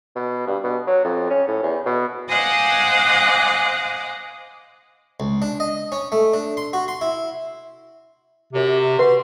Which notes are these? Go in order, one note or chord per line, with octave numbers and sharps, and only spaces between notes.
B2
G2
B2
F#3
F2
C#4
A2
E2
B2
C5 D#5 F5 F#5 G#5 D6
C#2
D4
D#5
C#4
A3
D4
C6
F#4
C6
E4
F#2 C3
F#4 B4 F#5 C6